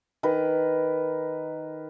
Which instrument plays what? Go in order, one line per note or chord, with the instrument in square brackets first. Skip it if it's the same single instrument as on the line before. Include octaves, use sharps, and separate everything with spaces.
[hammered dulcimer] D#3 A#4 B4